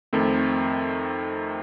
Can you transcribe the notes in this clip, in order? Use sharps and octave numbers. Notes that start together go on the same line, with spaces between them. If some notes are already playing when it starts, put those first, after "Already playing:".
F2 D#3 A3 C4